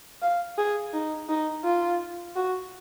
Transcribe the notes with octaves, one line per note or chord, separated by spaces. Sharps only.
F5
G#4
D#4
D#4
F4
F#4